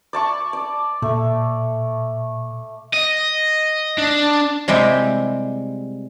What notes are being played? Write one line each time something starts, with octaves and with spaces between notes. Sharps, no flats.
D5 A5 C#6
D5
A#2 A3
D#5
D4
C3 G3 G#3 E4 G4